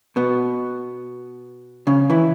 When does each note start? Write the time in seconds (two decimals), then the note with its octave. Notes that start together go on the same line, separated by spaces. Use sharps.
0.16 B2 B3
1.87 C#3 C#4
2.10 E3 E4